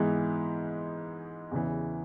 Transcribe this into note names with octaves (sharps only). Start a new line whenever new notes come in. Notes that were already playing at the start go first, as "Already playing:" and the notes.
Already playing: G#2 E3 G#3 B3
E2 C#3 E3